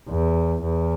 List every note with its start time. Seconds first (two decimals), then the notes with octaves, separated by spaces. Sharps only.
0.10 E2
0.63 E2